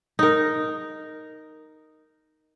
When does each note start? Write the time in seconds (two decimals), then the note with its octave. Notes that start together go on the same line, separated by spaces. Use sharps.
0.19 D#4 A#4